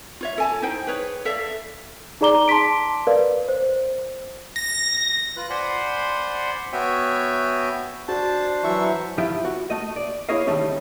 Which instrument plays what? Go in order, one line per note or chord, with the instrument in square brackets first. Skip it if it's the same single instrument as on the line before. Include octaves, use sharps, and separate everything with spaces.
[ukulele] F4 C#5 E5
A4 G#5 A5
D#4 E4 C5 G5
G#4 B4 C#5
A4 D5 E5 F5
[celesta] D#4 G#4 D5 A#5 D6 G7
A5 C6 D6 B6 D7
A#4 B4 D5 F5
C5
[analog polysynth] A#6
[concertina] F4 B4 F#6
C5 D5 F#5 G#5 B5 C6
B3 F#4 C#5 E5 G5 G#5
[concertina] D4 C5 [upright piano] F#4 [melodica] A5
[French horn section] E3 F#3 [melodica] E5 C#6
[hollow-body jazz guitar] G2 F3 E4 F4 G5
F#4
A3 D#5
D5
E4 G#4 C#5 D#5 F5
D#3 F#3 G3 A3 C#4